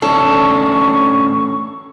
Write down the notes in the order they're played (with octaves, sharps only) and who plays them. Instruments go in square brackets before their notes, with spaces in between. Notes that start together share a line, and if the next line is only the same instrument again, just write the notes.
[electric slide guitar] A3 C#4 D4 [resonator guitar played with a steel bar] A4 [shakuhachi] C#6